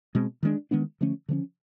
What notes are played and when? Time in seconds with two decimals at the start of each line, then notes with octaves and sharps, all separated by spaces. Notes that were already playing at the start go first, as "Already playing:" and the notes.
0.15 B2 G#3 C4
0.43 D#3 G#3 B3 D4
0.71 D#3 G#3 B3 D4
1.01 D3 F3 A3 C#4
1.29 D3 F3 A3 C#4